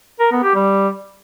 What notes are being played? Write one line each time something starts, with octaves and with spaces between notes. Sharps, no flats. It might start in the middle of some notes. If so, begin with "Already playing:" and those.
A#4
B3
G4
G3